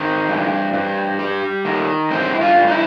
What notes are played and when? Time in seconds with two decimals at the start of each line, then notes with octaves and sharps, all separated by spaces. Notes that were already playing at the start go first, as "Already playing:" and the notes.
Already playing: D#3 C4
0.29 G2
0.73 G2
1.19 G3
1.65 D#3
2.11 G2 C4
2.32 E4
2.41 F4
2.56 G2
2.67 D#4
2.72 E4